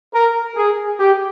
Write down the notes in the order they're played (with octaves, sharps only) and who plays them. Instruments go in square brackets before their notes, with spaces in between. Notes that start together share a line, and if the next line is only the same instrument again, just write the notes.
[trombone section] A#4
G#4
G4